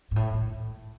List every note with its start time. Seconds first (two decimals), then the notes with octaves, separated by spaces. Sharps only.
0.11 G#2
0.16 A2
0.33 A2